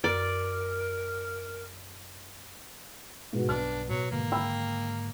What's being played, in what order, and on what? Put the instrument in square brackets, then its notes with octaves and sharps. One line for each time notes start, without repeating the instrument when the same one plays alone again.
[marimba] F#2 [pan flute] A#4 [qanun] D5
[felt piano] G#2 B2 F#4
[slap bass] B1 G2 [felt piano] B3 F6 [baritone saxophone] D4
[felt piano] B2 [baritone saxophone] F#3
[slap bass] G#2 D3 D#3 [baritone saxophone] A#3
[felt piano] G5 B5 E6